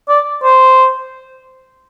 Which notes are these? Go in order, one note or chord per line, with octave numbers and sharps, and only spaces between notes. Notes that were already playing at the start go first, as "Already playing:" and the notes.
D5
C5